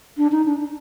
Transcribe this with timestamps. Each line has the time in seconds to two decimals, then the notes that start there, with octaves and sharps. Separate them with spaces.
0.17 D4
0.32 D#4
0.46 D4
0.60 D4